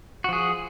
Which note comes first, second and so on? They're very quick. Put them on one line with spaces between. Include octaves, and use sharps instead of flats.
F#4 F3 G#4